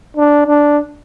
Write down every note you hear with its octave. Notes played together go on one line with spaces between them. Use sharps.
D4
D4